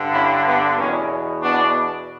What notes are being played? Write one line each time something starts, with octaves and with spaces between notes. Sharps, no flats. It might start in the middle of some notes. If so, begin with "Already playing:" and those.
Already playing: G2 D3
C#4 E4
B3 D4
E2 B2 A#3 C#4
B3 D4